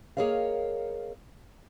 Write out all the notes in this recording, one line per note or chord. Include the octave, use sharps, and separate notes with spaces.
A#3 G#4 A#4 C#5 D#5 F5